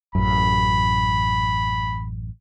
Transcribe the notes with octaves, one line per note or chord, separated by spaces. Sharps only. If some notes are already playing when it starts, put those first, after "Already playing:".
A1 F#2 B5